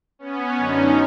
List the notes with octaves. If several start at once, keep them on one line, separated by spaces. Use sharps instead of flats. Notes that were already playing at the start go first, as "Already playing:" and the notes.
B3 C#4
F#2 D3 F#3 C#4 D#4